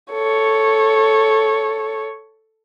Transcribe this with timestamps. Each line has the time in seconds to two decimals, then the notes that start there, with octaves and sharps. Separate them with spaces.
0.13 A4 C#5